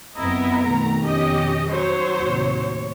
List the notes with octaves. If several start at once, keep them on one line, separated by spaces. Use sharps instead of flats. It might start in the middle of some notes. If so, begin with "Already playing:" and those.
F#1 F2 B3 C4 E4 A#4 D#5
F2 B2 D#3 A3 A#5
C#4 G4 D#5
F#3 C5 C#5
D#2 A2 C3